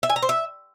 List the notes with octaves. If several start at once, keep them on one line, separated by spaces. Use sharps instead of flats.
E5
G#5
A#5
C5
E5